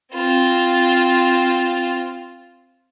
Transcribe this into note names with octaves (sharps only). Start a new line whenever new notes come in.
C4 F4